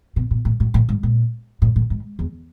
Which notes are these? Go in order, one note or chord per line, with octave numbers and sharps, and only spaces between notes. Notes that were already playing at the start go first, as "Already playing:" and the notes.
B2
A#2
A2
A2
A2
G#2
A#2
A2
A2
G#2
E2